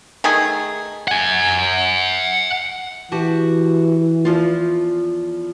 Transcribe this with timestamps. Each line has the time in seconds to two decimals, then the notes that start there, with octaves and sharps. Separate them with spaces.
0.24 D#3 A3 G#4
1.08 F#5 G#5
3.12 E3 F#4 G4 A5
4.25 E2 F3 F4